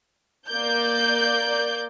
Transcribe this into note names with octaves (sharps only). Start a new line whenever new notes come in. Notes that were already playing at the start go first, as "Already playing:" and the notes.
A#3 D5 G6